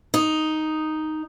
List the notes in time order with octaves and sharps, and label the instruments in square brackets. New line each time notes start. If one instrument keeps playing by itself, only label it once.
[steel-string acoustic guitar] D#4